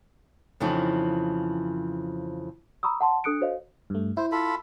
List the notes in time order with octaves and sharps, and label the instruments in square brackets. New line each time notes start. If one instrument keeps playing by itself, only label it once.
[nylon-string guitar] F2 C#3 E3 F3 D#4
[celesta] A#5 B5 C#6 D#6 E6
F#5 A5 C6
D4 A4 D#6 F#6 C#7 D7
F#4 A4 C5 C#5 D#5 F5
[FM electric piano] G2 A3
[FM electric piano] E4 [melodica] C5
[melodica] F4 A4 B5